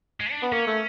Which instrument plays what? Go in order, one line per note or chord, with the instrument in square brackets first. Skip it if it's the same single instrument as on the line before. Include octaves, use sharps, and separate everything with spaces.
[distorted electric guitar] G#3
D4
[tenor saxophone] B3
[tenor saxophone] A#3 [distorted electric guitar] C#4
[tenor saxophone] A3